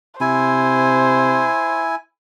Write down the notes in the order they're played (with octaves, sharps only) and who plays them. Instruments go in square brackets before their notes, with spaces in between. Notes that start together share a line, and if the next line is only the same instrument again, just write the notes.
[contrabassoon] C3 [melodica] E4 G#5 [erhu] C5